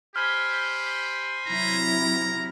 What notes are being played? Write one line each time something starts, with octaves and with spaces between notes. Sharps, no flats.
G4 C5 G#5 B5 F6
C3 F#3 E4 A#5